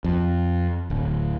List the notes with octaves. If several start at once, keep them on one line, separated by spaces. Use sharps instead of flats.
F2
D1